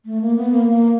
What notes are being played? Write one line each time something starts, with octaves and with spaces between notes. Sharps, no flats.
A3
A#3
B3
A#3
A#3